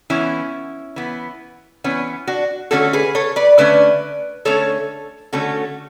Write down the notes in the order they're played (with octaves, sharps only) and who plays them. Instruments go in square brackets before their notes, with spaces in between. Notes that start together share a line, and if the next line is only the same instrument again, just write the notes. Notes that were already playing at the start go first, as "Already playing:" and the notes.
[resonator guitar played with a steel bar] E3 B3 C#4 E4
E3 B3
E3 B3 C#4
D4 F#4
D3 A3 C#4 F#4 A4
G#4 B4
A4 C#5
B4 D5
D3 A3 C#4 B4 D5
D3 A3 C#4 A4 C#5
D3 A3 C#4 F#4 A4